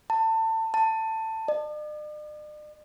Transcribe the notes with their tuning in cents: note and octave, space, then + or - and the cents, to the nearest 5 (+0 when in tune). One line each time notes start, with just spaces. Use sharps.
A5 +25
A5 +15
D5 +45